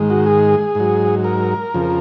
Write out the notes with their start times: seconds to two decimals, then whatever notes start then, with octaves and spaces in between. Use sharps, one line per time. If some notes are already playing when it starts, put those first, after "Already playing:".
Already playing: G#2 D#3 G#3
0.10 F#4
0.26 G#4
0.75 G#2 F#3
1.24 A#4
1.74 F2 C#3 F3